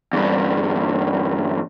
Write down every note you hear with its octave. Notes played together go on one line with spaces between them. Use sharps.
E2 G2